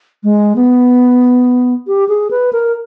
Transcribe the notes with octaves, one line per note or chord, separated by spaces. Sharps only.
G#3
B3
G4
G#4
B4
A#4